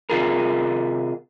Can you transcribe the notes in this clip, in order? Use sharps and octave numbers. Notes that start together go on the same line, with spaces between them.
C3 F4 G#4 A#4